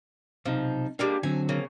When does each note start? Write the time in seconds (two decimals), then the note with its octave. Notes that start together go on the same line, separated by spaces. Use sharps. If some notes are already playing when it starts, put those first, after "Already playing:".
0.46 B1 C3 F3 D#4
0.99 G3 G#3 A#3 D4 G4
1.23 D3 F#3 C4 G#5
1.49 C#3 A#3